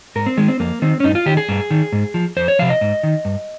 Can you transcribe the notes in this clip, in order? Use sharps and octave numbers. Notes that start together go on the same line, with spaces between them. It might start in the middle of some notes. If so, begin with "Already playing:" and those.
G#2 A#4
C4
D#3 G#3
C4
F2 A#3
D#3 C4
C#4
G2 D#4
F4
D#3 G4
G#4
G2
D#3
G#2
F3
F2 C5
C#5
C3 F3 F5
D#5
G#2
D#3
G2